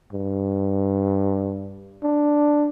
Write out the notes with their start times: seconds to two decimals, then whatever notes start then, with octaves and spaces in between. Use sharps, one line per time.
0.12 G2
2.02 D4